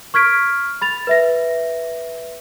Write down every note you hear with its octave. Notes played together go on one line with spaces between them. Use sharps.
C#6 F6 G#6 B6 D7
B5 A6 F7
B4 E5 A#6